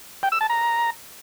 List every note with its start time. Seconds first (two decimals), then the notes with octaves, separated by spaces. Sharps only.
0.23 G5
0.32 E6
0.41 A5
0.50 A#5